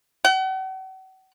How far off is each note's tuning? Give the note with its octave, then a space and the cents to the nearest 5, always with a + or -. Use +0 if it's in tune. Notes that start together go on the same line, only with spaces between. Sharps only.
F#5 +40